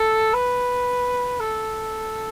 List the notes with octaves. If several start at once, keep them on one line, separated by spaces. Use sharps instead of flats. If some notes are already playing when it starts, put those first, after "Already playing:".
Already playing: A4
B4
A4